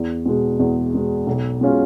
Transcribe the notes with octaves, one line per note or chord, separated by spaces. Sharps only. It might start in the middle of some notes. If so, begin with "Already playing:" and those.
Already playing: E2
B2 G#3
E2
B2 G#3
B1
B2 G#3 C#4 F4